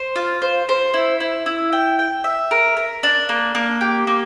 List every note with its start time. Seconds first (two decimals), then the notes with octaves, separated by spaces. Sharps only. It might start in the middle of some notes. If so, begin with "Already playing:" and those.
Already playing: C5
0.16 F4
0.42 C5
0.69 C5
0.94 E4
1.20 E4
1.46 E4
1.73 G5
1.99 G5
2.24 E5
2.51 A#4
2.77 A#4
3.03 D4
3.29 A#3
3.55 A#3
3.81 G4
4.07 A#3